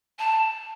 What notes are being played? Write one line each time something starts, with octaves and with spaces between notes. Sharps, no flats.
A5